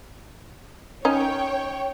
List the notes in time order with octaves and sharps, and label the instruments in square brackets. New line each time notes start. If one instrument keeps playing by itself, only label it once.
[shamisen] C#4 D#4 [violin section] C#5 G5